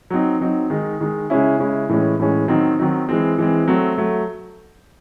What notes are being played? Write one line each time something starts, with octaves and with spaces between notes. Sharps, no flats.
F#3 C4 D#4
F#3 C4 D#4
D#3 G#3 D#4
D#3 G#3 D#4
C#3 G#3 C#4 E4
C#3 G#3 C#4 E4
A2 E3 G#3 C#4
A2 E3 G#3 C#4
D#3 F#3 C4 D#4
D#3 F#3 C4 D#4
E3 G#3 C4
E3 G#3 C4
F#3 A3 C4
F#3 A3